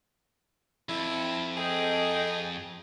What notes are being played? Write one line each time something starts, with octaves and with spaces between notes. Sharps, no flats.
F2 E4
G#4 A4 D#5 G5